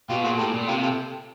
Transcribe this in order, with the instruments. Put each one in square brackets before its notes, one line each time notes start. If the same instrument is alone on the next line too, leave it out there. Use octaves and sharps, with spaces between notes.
[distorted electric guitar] B2 [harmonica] F4 G4
[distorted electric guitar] A#2 [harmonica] F#4 G#4
[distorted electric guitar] A2 [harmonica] G4 A4
[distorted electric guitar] A#2
[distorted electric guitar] C3 [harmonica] F4 G4
[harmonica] G4 A4